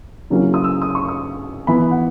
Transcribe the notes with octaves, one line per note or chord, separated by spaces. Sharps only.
C#3 F#3 A#3 C#4 E4
D#6
E6
D#6
C#6
D#6
E3 B3 E4 B5
F#5